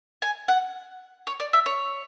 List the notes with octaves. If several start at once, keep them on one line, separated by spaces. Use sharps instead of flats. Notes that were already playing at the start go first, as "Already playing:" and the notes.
G#5
F#5
C#5
D5
E5
C#5